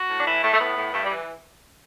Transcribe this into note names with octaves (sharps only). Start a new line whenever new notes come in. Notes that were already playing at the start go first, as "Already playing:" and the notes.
Already playing: F#4
A2
D4
E3 E4
A2 A3
A3
A2 B3
A2
G2 A3
G3
E3